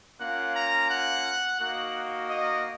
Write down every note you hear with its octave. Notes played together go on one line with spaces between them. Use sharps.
A#3 C#4 F4 F#5
A#5
F#5
A#3 D#4 F#4 F#5
D#5